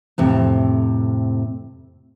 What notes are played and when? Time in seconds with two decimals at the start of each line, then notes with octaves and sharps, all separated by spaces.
0.18 F2 A2 C3